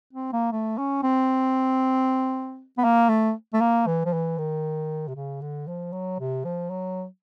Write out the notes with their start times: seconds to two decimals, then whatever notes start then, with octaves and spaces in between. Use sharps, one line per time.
0.13 C4
0.33 A#3
0.52 A3
0.78 C#4
1.03 C4
2.78 B3
2.84 A#3
3.09 A3
3.54 A3
3.61 A#3
3.87 E3
4.06 F3
4.13 E3
4.38 D#3
5.08 C3
5.15 C#3
5.41 D3
5.67 F3
5.93 F#3
6.20 C3
6.45 F3
6.70 F#3